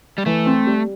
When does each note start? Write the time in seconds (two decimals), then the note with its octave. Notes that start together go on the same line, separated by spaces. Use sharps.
0.18 G3
0.26 E3 A3
0.46 C4
0.67 G3